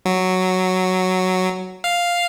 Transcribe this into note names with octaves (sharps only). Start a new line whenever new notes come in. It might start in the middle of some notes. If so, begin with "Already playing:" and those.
F#3
F5